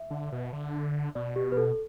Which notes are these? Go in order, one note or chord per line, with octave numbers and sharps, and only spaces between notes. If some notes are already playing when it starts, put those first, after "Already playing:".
Already playing: E5
D3
B2
D3
B2 D5
G4
B4
A4